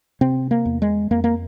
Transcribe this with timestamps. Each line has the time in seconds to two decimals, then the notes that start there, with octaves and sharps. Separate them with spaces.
0.21 C3 C4
0.51 A#3
0.65 E2
0.82 G#3
1.11 F2 A#3
1.24 A#3